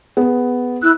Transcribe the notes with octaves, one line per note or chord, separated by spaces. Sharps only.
B3 G#4
E4 E6 F#6